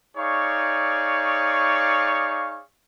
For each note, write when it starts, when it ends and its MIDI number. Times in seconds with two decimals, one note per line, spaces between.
0.17 2.64 63
0.17 2.64 68
0.17 2.64 73
0.17 2.64 74
0.17 2.64 77
0.17 2.64 85